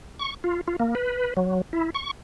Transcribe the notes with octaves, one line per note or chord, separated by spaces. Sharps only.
C#6
F4
F4
A#3
B4
F#3
E4
C#6